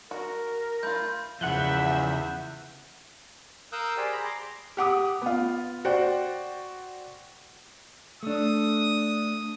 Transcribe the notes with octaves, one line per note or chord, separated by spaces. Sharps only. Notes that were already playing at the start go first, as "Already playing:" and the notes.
F#4 A#4
A3 F4 B5 G6
E2 C#3 F3 E5 F#5 F#6 G6
A#4 F5 D#6 E6 F#6 G6
G4 G#4 C5 D5 G5
G#4 A#5 B5
A#5 C6 D6
G4 F#5 D6 D#6
B3 F4
F#4 C5 D5 F#5 G5
A3 D4 D#6